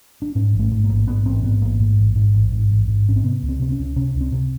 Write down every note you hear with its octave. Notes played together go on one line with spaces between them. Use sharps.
D4
G#2 C#4
A1
A3
G#2
A#3
A1
G#2 B3
A1 C4
G#2 B3
A1 A#3
G#2
A1
G#2
A1
G#2
A1
G#2
A1 C#4
C4
C3 B3
C#2
C4
C3 C4
C#4
C#2
C3 C#4
C#2
C4
C3